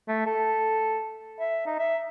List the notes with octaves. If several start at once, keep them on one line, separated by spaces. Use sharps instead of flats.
A3
A4
E5
D#4
E5